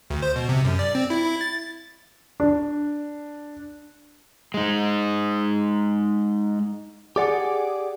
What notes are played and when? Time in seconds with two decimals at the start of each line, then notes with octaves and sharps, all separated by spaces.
0.10 D2
0.22 C5
0.36 B2
0.49 C3
0.65 F#2
0.79 D5
0.95 C4
1.10 E4
1.25 E4
1.41 A6
2.40 D4
4.54 G#3 D#4
7.16 G4 G#4 D5 F#5 D6